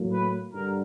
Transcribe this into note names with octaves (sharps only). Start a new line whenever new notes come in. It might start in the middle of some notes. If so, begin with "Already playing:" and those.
Already playing: A2 F#3 A#3
B4
G2 D3 G3 A#4